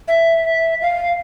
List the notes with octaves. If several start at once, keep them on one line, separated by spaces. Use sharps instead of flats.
E5
F5